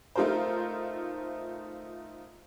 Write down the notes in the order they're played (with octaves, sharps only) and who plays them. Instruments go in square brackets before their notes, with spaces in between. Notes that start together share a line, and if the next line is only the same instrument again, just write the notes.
[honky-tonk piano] A3 D#4 F4 A#4 C5